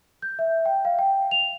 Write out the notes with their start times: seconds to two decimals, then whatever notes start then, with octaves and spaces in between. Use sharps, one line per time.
0.22 G6
0.39 E5
0.65 G5
0.85 F5
0.99 G5
1.31 F7